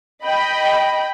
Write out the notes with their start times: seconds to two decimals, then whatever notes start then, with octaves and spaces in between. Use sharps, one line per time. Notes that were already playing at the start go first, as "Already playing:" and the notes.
0.24 D#5 G5 B5